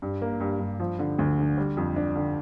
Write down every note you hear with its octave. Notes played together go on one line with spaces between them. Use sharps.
G2
A#3
G2
G2
F3
D3
D2
D3
G3
F2
D4
D3